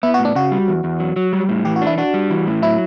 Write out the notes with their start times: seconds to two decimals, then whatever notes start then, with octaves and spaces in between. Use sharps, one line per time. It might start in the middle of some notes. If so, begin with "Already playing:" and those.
0.03 B3 E4
0.14 F#4
0.19 A2
0.25 D4
0.35 C#3 F#4
0.52 G3
0.68 E2
0.84 E2
1.00 F#3
1.16 F#3
1.33 G3
1.49 A2
1.65 E3 G4
1.76 F#4
1.81 D4
1.87 E4
1.98 D4 F#4
2.14 G3
2.30 E3
2.47 A2
2.62 F#3 E4